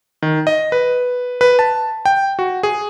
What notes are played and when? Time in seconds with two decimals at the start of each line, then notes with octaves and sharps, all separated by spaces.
0.22 D#3
0.47 D#5
0.72 B4
1.41 B4
1.59 A5
2.05 G5
2.39 F#4
2.63 G#4